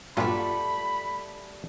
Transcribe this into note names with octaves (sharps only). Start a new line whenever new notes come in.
G2 A#2 F#3 G3 A3 F4 F#5 B5